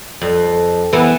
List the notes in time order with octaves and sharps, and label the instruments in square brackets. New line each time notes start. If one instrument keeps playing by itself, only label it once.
[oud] F2
E3 B3